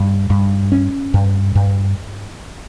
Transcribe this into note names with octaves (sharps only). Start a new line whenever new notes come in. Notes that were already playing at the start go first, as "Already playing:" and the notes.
Already playing: G2
G2
C#4
G2
G2